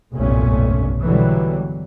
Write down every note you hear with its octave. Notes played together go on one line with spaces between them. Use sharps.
F1 B1 G2 A#2 A3 C#4
B2 D3 E3 F#3 G3